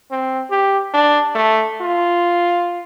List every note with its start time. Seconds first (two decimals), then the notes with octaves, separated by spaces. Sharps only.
0.11 C4
0.51 G4
0.94 D4
1.35 A3
1.81 F4